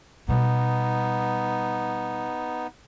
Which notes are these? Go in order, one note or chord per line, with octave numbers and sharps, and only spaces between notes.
B2 G3 B3 D#4